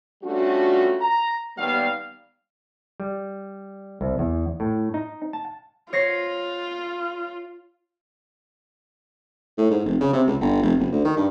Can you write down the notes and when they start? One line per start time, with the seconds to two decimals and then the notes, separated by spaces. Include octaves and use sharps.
0.23 G3 A3 C#4 D4 F4 F#4
1.00 A#5
1.57 D#2 G3 B3 F5
3.00 G3
4.01 C2
4.19 E2
4.60 A2
4.94 D#4
5.33 A5
5.93 F4 C#5 A#6 C7
9.58 A2
9.71 G#2
9.85 F1
10.01 C#3
10.13 C3
10.27 C#2
10.41 G1
10.62 F1
10.79 F#1
10.92 D2
11.05 D#3
11.17 G2